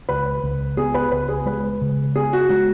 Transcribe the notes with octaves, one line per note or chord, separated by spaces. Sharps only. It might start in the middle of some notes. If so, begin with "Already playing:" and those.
C#2 B4
C#2
B3 G#4
B4
C#2 B4
G#4
G#3 B4
C#3
B3 G#4
F#4
G#3 F#4